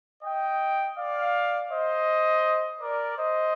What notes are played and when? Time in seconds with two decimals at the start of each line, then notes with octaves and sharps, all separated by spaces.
0.23 D#5 G5
0.96 D5 F5
1.70 C5 D#5
2.80 A#4 D5
3.17 C5 D#5